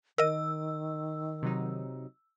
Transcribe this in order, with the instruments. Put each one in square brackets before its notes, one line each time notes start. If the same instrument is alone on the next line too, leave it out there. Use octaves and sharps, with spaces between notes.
[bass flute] D#3 [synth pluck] A#4 D#5 [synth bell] E6
[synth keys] C3 F#3 D#4